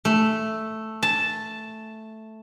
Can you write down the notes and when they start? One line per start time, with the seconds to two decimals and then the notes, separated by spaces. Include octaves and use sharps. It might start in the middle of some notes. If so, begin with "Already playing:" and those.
0.05 A3
1.03 A5